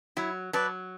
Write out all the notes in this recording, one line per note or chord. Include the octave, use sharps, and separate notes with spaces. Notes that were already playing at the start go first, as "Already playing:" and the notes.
F#3 E4
F#3 B4 D5 A5